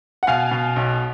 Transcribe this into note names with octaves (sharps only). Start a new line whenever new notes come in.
F#5
B2 F5 G#5
B2
B1